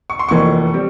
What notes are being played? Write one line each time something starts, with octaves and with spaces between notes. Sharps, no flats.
C#6
C6
F1 F2 E3 A#3 C#6
G3 C4